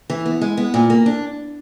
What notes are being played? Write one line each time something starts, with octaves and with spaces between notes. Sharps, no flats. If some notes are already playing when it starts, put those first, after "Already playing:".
E3
B3
G#3
B3
A#2
A#3
D4